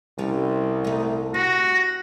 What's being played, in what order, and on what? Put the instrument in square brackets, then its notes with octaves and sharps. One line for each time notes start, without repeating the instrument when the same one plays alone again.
[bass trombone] C2 [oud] G3 C#4
[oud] A3 D#4
[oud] C4 [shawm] F#4 [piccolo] A#6